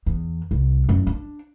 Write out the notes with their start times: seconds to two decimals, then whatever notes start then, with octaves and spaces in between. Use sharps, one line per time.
0.06 E2
0.51 C2
0.89 F#2
1.07 D4